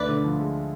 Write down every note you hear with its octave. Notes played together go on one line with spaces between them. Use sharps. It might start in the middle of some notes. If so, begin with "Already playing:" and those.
Already playing: D2 B4 D5
D3
F3
G#3